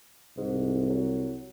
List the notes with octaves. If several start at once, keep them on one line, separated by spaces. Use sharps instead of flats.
C2 G#2
F#3